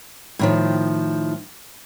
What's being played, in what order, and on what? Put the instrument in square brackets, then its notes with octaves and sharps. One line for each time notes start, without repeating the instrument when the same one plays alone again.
[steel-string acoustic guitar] A2 D#3 F3